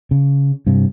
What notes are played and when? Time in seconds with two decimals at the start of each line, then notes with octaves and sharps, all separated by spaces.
0.11 C#3
0.67 G2 C3